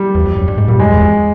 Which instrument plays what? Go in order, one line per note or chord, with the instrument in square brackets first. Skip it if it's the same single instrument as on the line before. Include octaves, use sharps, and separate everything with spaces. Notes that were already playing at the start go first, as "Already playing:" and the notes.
Already playing: [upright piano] G3
[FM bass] E2
F2
F#2
G2
G#2
[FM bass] A#2 [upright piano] G3
[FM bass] F#2 [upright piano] G#3
[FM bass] E2
F2